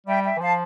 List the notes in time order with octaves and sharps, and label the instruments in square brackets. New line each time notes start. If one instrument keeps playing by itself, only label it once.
[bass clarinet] G3 [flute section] E5 G5
[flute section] E5 G5
[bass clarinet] E3
[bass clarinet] F3 [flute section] F5 A5